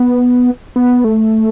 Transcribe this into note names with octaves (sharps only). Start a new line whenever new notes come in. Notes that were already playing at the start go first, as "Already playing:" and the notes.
Already playing: B3
B3
A3